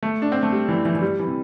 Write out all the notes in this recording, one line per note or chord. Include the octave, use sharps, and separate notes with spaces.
A3
D4
C4
A3
G3
E3
E3
E3
G3
E3
C3